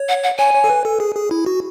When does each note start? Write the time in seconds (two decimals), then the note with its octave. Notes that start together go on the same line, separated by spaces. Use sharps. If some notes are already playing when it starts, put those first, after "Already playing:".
Already playing: C#5
0.09 F#5
0.23 F#5
0.38 C#5 G#5
0.54 C#5
0.64 A4
0.69 B4
0.85 A4
1.00 G#4
1.16 G#4
1.31 E4
1.46 F#4